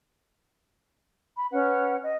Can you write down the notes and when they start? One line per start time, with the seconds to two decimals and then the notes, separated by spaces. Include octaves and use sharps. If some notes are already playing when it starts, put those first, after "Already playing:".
1.38 B5
1.51 C#4 B4 F#5
2.02 D#5